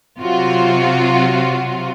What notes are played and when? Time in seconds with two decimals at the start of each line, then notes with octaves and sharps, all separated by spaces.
0.20 C3 F#3 F4 F#4